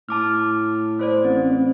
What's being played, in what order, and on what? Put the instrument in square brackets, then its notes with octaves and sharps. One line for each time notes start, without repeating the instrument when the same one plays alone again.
[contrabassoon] A2 [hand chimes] A5 D6 F6
[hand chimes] A3 C5 D5
[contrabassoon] A1 [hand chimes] C4